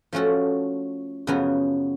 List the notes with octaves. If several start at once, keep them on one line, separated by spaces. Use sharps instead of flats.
F3 A3 C#4 F#4 A4
F#2 C#3 F3 B3 F#4